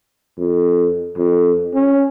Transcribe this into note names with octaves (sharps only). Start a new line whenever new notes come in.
F2
F2
C#4